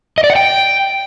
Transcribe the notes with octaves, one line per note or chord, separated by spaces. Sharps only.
D#5
D5
F#5
G5